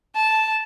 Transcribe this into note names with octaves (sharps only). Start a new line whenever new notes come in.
A5